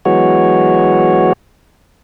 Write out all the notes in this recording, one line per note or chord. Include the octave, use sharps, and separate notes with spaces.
E3 F#3 G#3 B3 F#4 C#5